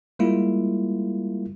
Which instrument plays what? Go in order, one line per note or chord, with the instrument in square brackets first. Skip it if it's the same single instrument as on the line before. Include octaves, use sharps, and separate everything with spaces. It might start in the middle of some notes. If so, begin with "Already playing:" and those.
[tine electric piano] G3 G#3 A#3 E4 F4